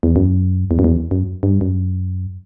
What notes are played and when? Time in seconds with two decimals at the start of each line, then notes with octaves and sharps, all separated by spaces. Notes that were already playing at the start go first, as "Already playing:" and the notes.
0.03 E2
0.16 F#2
0.71 E2
0.79 F#2
0.84 E2
1.11 F#2
1.43 G2
1.61 F#2